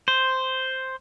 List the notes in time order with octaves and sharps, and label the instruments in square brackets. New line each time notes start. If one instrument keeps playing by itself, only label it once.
[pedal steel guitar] C5